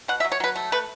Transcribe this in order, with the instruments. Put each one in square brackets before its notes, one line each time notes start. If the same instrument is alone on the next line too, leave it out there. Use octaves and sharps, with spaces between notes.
[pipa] B2 F#5
E5
F#3
C#5
F#3 B4
A3
A3 B4